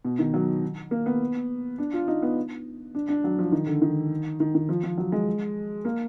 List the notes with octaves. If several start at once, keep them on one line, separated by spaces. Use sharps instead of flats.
B2
D#3
F#3
A#3
B3
D4
F4
D#4
B3
D4
D4
F#3
F3
D#3
D3
D#3
D#3
D#3
F3
F3
F#3
G#3
A#3